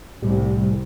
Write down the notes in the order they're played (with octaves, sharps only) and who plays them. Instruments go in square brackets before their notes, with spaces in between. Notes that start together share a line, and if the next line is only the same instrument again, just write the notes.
[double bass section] C2 [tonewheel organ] A2 G3